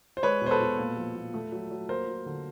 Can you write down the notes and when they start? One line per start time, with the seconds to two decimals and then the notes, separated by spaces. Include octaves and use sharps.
0.17 C5
0.23 G#3 B4 C#5
0.41 B2 C5
0.51 A4 B4
0.60 B2
0.78 A#2
0.97 F3
1.16 A#2
1.34 A3
1.52 F#3
1.71 F#3
1.89 A#3 A#4 C5
2.08 F#3
2.26 D3